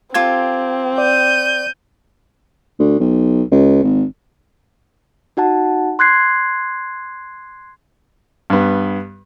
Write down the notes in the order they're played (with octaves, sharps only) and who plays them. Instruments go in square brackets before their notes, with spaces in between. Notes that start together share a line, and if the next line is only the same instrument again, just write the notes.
[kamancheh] C4 [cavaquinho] F4 G4 A4 [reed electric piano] G#6
[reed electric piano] D5 [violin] G6 D#7
[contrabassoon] D2
B1
C#2
G#1
[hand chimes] D#4 F#4 F#5 A5
C6 F#6 G#6 C7
[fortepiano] G2 B3